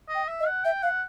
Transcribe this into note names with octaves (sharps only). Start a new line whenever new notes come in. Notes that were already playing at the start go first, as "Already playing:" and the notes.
D#5
G5
E5
D#5
F#5
E5 G5
F5 F#5